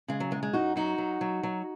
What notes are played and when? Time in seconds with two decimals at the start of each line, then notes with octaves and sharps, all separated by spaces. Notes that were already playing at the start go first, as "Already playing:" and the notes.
0.08 C#3 G#3
0.20 F#3
0.31 F#2 G#3
0.43 G#3
0.53 F#2 D#4 F#4
0.76 F#3 D#4 F#4
0.98 F#3
1.21 F#3
1.43 F#3